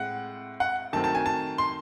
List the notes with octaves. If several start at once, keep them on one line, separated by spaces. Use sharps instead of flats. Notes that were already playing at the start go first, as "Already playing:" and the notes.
Already playing: A2 G#3 C4 F#5
F#5
D#3 F#3 A3 C4 A5
A5
G#5
A5
C6